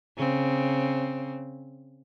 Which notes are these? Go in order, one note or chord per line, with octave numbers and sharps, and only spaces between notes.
C#3 C4